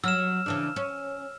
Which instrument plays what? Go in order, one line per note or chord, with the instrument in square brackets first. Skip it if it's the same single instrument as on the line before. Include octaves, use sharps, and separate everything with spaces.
[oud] F#3 [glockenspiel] E6 F6 E7
[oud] C#3 E3 D4
C#4